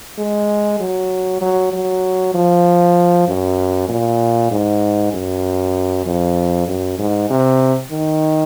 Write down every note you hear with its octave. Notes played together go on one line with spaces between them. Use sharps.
G#3
F#3
F#3
F#3
F3
F#2
A#2
G#2
F#2
F2
F#2
G#2
C3
D#3